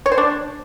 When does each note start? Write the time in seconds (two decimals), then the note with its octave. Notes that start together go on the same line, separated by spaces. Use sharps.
0.06 C#5
0.12 C5
0.18 D4